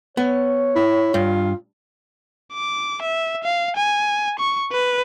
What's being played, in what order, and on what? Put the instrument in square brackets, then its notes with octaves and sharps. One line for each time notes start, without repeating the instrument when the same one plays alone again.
[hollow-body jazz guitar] B3 [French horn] C#5
[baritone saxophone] E4
[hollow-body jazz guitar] G2 [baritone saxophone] F4
[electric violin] D6
E5
F5
G#5
C#6
B4